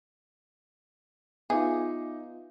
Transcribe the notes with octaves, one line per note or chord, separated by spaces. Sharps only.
B3 D#4 F4 G#4 E5 D6